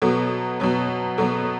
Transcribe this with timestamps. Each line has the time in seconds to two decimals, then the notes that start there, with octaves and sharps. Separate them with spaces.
0.02 B2 F#3 B3 A4
0.60 B2 F#3 B3
1.18 B2 F#3 B3 A4